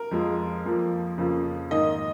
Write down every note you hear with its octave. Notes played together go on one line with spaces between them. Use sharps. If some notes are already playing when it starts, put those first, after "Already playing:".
Already playing: A#4
F2 F3 G#3
F2 F3 A#3
F2 C#3 F3 A#3
G#2 D#3 A#3 D#5